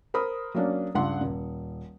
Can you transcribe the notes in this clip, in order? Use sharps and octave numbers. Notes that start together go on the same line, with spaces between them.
A#4 C5 B5 D#6
F#3 A#3 C#4 D4
C#2 G2 F#5 C6
D#1